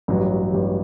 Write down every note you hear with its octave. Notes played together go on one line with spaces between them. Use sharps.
A1 G2 F#3
A1 G2 F#3